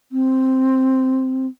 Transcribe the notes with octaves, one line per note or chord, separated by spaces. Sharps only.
C4